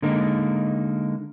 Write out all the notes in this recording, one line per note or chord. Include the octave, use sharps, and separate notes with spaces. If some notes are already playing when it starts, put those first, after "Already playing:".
D3 G#3 A#3 D#4